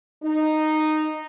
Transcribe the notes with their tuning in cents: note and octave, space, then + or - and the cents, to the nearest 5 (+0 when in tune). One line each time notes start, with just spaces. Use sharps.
D#4 -10